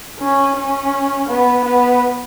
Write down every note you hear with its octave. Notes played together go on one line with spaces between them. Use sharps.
C#4
C#4
B3
B3